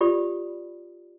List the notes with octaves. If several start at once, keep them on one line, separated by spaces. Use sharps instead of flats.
F4 G4 D5 B5 D#6